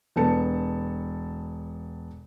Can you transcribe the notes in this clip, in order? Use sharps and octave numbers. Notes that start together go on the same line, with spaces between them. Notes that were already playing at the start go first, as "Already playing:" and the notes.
E1 B3 A4 A5 C#7